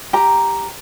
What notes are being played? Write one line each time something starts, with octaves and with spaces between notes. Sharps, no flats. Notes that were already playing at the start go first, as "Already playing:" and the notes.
G4 A#5